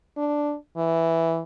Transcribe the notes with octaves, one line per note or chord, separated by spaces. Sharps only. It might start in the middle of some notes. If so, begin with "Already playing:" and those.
D4
E3